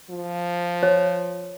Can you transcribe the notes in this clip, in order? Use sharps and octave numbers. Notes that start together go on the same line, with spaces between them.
F3
C#5